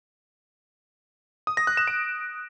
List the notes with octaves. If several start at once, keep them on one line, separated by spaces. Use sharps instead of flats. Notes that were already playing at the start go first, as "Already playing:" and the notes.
D#6
A#6
F#6
E7
D7